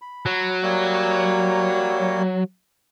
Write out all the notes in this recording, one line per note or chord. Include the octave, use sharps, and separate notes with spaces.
B5
F#3
G3 A#3 C#5